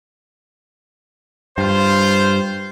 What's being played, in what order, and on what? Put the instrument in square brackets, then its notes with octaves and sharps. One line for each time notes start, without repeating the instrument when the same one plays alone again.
[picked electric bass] G2 [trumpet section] F4 C5